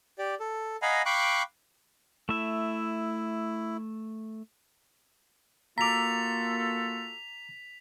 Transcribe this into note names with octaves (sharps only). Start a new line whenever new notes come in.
G4 D5
A4
D#5 F5 F#5 G#5 A#5 B5
F5 G5 B5 C#6 D6 F#6
A3 E4 E5
A#3 F4 F#4 A4 A#5 D6 B6 F7